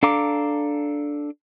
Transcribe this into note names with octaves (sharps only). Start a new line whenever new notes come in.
D4 A4 F5 A#5 D6